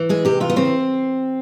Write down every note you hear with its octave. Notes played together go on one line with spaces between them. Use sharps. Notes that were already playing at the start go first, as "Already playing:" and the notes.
Already playing: E3
G#3 G#4
C3 G4
E3 F4
B3
C#3 C4